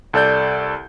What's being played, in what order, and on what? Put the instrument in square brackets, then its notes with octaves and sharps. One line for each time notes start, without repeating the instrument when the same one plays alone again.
[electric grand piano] C2 A4 D5 G6